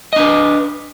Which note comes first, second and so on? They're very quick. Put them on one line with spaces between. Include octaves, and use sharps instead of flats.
D#5 D4 B4